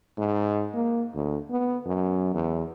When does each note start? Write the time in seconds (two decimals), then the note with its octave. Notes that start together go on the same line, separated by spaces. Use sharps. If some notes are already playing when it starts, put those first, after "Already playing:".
0.18 G#2
0.74 A#3
1.14 D2
1.50 B3
1.85 F#2
2.34 E2